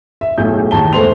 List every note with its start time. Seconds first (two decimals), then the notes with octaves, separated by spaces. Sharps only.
0.21 E5
0.38 B1 A2 G#4 G6
0.71 D#2 A2 A5 G7
0.93 E1 A3 G#4 C5 C6 F7